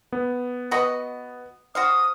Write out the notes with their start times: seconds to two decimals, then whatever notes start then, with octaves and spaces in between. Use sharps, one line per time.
0.13 B3
0.71 F#4 B4 D#5
1.75 F#4 C5 F5 D#6